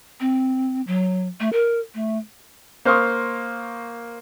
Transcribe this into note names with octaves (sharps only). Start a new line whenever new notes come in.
C4
F#3
A3
A#4
A3
A#3 C5 F5 C6 C#6 D#6